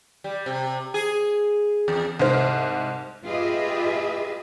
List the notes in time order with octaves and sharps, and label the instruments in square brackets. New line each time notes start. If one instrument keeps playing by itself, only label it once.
[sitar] G3
C3
G#4
E2
[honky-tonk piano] C2 G#2 C5 F6
[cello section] F4 G4 G#4 B4 D#5 E5